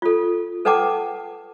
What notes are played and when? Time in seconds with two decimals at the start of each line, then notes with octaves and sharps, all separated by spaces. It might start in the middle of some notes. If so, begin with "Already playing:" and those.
0.02 F4 A4
0.65 A4 B4 F#5 G5 A5 D6